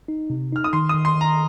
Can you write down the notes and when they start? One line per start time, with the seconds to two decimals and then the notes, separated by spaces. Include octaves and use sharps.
0.08 D#4
0.30 C3
0.52 D#4 F6
0.64 D#6
0.73 D#3 C6
0.89 D#6
0.95 D#3
1.05 C6
1.16 D#3 A#5